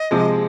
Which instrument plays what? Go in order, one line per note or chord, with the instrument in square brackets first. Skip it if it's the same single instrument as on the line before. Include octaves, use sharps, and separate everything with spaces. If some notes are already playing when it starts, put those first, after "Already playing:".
Already playing: [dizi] D#5
[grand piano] C3 F3 G#3